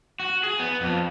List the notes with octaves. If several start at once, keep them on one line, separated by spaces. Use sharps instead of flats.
F#4
G#4
B3
F2